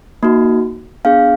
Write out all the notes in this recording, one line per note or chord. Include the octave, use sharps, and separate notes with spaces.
A#3 D#4 F#4
B3 D4 G#4 F5